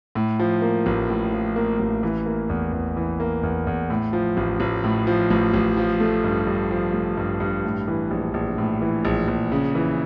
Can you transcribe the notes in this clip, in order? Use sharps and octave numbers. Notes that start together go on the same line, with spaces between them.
A2
F3
A#3
A1
A2
F3
A#3
A1
E3
A#3
E2
E2
E3
A#3
E2
E2
A2
F3
A1
A1
A2
F3
A1
A1
F3
A3
G2
G2
F3
A3
G2
G2
A2
E3
A#1
A#1
A2
E3
A#1
A#1
C#3
E3